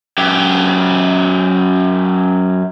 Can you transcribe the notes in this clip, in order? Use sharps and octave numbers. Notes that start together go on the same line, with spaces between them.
F#2 G4